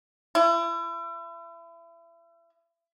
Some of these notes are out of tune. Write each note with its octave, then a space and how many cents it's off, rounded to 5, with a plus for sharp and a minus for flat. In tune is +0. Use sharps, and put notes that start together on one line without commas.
E4 +35